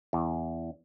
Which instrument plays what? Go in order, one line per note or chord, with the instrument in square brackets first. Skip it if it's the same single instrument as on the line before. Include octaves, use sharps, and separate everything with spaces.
[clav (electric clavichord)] E2